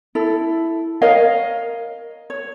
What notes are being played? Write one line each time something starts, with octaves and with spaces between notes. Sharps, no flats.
E4 A4
A#4 C#5 D#5 F5
C#5